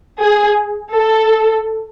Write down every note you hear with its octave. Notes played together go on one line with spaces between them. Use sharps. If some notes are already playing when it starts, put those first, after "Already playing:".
G#4
A4